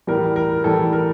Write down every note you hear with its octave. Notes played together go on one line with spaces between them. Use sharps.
A2 E3 G3 A#4
A#4
A2 E3 G3 A4
A#4